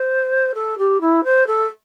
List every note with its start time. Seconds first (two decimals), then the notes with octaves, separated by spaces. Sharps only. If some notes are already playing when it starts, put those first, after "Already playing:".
Already playing: C5
0.54 A4
0.78 G4
1.01 E4
1.24 C5
1.47 A4